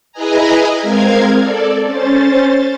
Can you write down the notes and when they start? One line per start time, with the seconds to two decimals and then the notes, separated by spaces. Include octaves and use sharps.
0.12 E4 G#4 B4 D#5 G#5 A#5
0.82 G#3 C4 A#4 F5 G#6
1.39 A4 D5
1.86 C#4 C5 A6